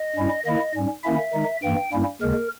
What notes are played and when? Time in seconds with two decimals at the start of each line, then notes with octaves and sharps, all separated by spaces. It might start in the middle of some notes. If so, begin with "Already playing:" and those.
Already playing: D#5
0.16 G2 G3 C#4 E4
0.45 D#3 A#3 E4 D#5
0.75 G#2 G3 C#4
1.04 D#3 A#3 C#4 E4 E5
1.33 D#3 G#3 D#4
1.63 G2 E3 A#3 G5
1.92 G2 G3 A#3 C#4 E4
2.22 D#2 C#3 G#3 A#4